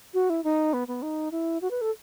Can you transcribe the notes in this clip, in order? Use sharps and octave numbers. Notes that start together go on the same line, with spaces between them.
F#4
E4
D#4
B3
B3
D#4
E4
F#4
B4
A4